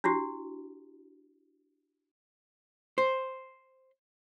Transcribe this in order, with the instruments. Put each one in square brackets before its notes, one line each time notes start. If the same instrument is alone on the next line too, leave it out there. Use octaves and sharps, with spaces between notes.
[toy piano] D4 E4 F#4 G4
[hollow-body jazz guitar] C5